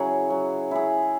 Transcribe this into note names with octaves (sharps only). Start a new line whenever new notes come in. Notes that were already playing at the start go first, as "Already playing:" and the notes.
Already playing: C#3 F#3 E4 G#4
F#3
E4 G#4